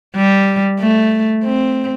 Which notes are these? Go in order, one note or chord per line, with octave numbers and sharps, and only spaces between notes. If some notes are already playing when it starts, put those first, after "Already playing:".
G3
A3
C4